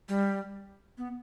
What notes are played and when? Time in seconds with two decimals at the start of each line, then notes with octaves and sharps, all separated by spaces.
0.09 G3
0.98 B3